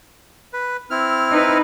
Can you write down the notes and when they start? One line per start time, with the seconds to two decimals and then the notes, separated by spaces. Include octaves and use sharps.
0.53 B4
0.90 C4 E4 F6
1.31 D#4 B4